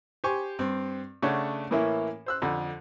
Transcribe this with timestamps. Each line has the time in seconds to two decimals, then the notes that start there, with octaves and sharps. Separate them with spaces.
0.24 G4 C5 G#5 C#6
0.59 G2 C4
1.23 C#3 A3 D4 C#5 F#5
1.71 A2 E3 A#3 C#4 E4
2.26 C5 E6 F#6
2.42 F2 D3